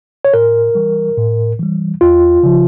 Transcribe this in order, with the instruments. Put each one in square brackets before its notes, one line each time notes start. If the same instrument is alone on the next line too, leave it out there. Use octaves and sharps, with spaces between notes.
[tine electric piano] C#5
A2 A#4
E3 G3
A2
E3 G3
E2 F4
C#3 F3